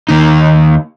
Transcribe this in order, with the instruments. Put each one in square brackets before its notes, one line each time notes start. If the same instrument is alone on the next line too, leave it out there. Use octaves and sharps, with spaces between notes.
[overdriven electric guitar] D#2 D#4